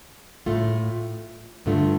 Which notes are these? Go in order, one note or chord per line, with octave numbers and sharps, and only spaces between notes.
A2 A3 F4
G2 D3 A3 F4